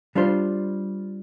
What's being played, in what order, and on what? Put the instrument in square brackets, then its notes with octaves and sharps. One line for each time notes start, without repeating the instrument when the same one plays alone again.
[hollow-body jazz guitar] G3 D4 F4 C5